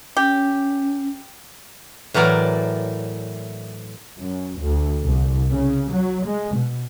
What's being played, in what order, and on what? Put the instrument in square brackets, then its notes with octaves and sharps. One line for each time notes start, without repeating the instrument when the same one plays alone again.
[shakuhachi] C#4 [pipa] G4
[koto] A2 E3 F#3 A#4 D5
[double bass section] F#2
D2
C2
C#3
F#3
G#3
B2